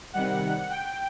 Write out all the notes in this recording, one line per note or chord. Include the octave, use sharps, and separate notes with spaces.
C3 D#3 G3 F#5
G5